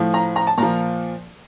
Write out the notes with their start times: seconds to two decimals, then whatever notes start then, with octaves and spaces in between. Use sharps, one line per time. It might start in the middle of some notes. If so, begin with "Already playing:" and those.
Already playing: A2 F3
0.14 A#5
0.36 A#5
0.47 A5
0.58 A#2 F3 A#5